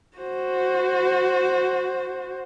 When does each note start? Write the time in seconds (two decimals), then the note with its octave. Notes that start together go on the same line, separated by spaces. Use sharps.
0.17 F#4 C5